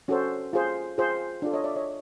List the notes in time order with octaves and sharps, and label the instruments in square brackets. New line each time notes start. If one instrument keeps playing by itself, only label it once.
[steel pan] C#4 F#4 A4 C5
F4 G#4 C5
F4 G#4 C5
D4 F4 A4 D5
C#5 D#5
D5 E5
C#5 D#5